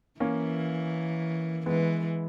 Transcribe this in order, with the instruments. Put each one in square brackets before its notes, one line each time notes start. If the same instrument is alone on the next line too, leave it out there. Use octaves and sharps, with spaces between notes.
[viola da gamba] E3 [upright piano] A#3 C#4
[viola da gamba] E3 [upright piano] G#3 B3